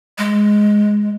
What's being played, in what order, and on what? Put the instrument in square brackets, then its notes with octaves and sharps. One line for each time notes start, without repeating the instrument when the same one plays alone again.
[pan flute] G#3